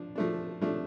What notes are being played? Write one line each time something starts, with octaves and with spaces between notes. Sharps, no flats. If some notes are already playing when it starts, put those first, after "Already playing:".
Already playing: F3 D4
F3 A3 D4
F3 A3 D4